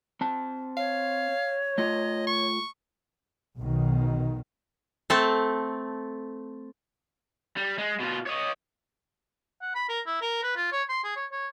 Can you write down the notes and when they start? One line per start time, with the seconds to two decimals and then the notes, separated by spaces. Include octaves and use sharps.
0.21 C4 A5
0.77 C#5 F5
1.78 A3 F4 D#5
2.27 C#6
3.57 B1 B2 D#3
5.10 A3 C4 A5
7.57 G3
7.78 G#3
8.00 B2 F4
8.27 C#5 D#5
9.62 F#5
9.75 B5
9.89 A#4
10.07 E4
10.22 A#4
10.43 B4
10.56 F4
10.72 C#5
10.89 C6
11.04 G#4
11.16 C#5
11.32 C#5